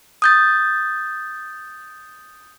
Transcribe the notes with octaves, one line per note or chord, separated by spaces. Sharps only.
D#6 G6 A6